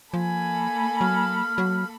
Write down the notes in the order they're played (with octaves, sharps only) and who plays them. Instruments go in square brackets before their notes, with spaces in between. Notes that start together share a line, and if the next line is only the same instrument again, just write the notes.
[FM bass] F3 [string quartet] A#3 A4 B5 [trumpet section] G#5
[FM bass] F#3 [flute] F6
[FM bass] F#3